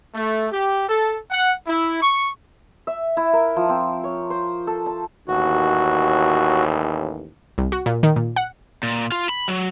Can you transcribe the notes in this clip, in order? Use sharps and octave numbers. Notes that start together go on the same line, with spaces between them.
A3
G4
A4
F#5
E4
C#6
E5
E4
A#4
F3
C4
C#5
C5
A4
A5
A1 D#2 F#4
C2
F#4
A#2
D#3
A#2
F#5
A#2
F4
B5
F#3